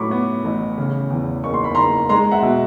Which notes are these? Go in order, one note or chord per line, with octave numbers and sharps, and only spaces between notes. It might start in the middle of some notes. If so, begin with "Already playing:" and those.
Already playing: A2 F#3 B5 C#6 D6
B3
A1
C#3
E2
F#1 C#6
C6
B5
F#1 A#5 C6
G#3 A#5 C6
E5 F#5
B2